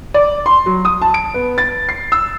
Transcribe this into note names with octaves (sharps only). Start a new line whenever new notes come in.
D5
C6
F#3
D#6
A5
D7
B3
A6
C7
E6